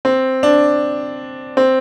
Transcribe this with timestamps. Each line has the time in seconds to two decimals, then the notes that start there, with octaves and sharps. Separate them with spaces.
0.05 C4
0.43 D4
1.57 C4